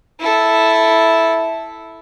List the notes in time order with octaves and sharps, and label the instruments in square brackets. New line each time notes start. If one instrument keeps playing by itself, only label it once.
[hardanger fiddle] E4 A4